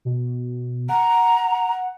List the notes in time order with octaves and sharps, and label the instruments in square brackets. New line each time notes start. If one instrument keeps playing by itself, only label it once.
[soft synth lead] B2
[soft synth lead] F#5 [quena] A#5